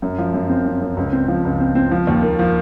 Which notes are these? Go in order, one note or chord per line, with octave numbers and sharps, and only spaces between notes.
F#2
F3
F#2
C4
F#2
F#2
C#2
C4
F3
C#2
C4
C4
F3
D#2
A#3
F3